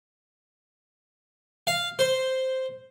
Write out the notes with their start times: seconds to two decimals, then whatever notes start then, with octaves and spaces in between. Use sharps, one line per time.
1.67 F5
1.99 C5